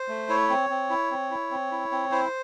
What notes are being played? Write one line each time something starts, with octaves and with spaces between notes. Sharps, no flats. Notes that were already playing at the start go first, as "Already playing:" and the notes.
Already playing: C5
A3
E4 C#5
C4
C4
E4
C4
E4
C4
E4
C4
E4 C5